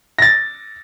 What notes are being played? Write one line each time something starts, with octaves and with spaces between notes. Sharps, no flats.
A6 A#6